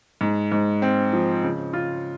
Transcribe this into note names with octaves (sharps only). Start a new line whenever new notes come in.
G#2
G#2
C4
F3
C#3
F4